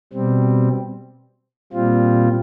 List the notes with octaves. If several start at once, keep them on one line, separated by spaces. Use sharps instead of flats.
B2 G3 C4
A#2 G3 C4 F4